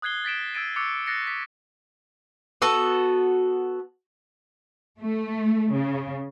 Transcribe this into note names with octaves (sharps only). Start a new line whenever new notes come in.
D#6 F#6 G#6 C7 G7
A6 B6 D7 E7
E6 G#6 A6 D7 D#7
C#6 D6 E6 F#6 A6 C#7
F#6 A6 A#6 C7 C#7
D6 B6 C#7
B3 F#4 A4
A3
C#3